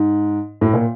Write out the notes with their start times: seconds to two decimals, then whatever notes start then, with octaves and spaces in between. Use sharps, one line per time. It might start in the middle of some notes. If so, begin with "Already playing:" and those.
Already playing: G#2
0.61 A2
0.73 A#2